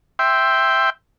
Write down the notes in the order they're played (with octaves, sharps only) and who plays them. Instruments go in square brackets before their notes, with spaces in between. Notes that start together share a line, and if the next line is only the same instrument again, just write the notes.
[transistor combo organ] E5 G5 C6